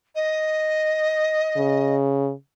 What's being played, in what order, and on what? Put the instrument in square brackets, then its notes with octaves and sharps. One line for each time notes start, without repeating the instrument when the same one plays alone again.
[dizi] D#5
[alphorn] C#3